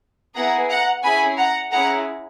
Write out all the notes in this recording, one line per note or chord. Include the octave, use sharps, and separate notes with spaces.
B3 E4 G#4 F#5 A#5
F#5 A#5
C#4 E4 G#4 G#5 B5
F#5 A#5
C#4 E4 G#4 F#5 A#5